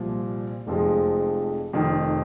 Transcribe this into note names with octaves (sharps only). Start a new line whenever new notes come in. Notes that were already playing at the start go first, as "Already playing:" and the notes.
Already playing: C2 A#2 F3
F1 F2 F3 G#3
F1 F2 D#3